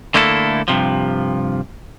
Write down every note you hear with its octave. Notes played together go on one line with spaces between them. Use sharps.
D3 A3 A#3 E4 G4 A4
G2 C3 F3